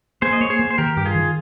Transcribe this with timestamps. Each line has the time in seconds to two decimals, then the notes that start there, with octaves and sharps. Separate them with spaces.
0.22 A#3 G#4 C5
0.33 D#5
0.41 A#3 C#5
0.50 G#4 C5
0.59 A#3
0.70 C5
0.78 D#3 G4 A#4
0.96 G2 G4
1.06 F4 G#4
1.15 D#3